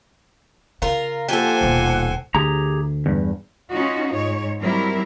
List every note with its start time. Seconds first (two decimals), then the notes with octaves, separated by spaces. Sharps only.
0.82 C#3 F4 A#4
1.28 F3 A#3 G4 A4 C5 F#5 G#5
1.61 D#1 B2
2.35 D2 G4 G#4 A#5
3.06 E2 G2
3.71 C#4 D#4 F4 F#4
4.12 G#2 C#5
4.61 F#3 G3 C4 E4 A#4